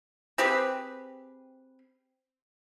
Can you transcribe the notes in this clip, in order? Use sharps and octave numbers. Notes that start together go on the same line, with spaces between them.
C4 G4 G#4 B4